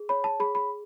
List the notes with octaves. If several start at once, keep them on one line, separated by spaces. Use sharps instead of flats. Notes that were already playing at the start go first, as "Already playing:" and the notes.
Already playing: G#4
C#5 B5
A5
G#4 B5
B5